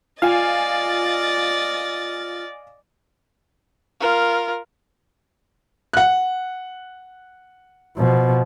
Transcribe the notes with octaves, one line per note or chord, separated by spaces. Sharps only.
F4 D5 D#5 F5 G#5 F6 A6
F4 A#4
F#5 F#6
B2 F3